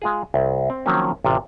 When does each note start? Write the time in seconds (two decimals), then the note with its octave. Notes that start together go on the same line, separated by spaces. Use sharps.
0.02 G#3 F4 G#4
0.34 C2
0.70 C4
0.86 D#3 F3 F#3 A#3 C4 C#4
1.24 A1 C3 F4